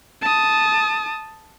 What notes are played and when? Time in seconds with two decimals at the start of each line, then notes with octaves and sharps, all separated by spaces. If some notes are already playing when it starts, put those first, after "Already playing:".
0.22 A5 D#6